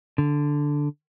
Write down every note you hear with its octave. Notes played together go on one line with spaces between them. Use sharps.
D3